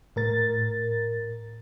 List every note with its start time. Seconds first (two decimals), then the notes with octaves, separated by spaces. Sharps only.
0.16 A2 A#4 A6